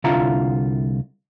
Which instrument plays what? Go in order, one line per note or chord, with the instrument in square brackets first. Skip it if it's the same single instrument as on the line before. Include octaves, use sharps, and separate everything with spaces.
[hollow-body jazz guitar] C2 D3 E4 F4 A#5